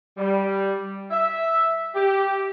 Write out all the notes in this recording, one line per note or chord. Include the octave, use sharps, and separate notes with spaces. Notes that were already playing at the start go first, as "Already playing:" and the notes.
G3
E5
G4